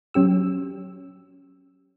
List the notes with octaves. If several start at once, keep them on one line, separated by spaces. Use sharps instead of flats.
F#3 C#4 G4 E6